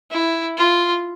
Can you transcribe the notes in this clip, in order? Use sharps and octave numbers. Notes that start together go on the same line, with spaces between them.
E4
F4